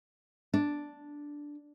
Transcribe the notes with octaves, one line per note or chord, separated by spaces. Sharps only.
D4